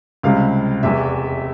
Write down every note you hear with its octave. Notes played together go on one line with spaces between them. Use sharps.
C#2 C3 G3 F5
F1 E2 E3 E5